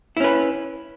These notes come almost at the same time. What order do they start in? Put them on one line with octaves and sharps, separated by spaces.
E4 C#4 B4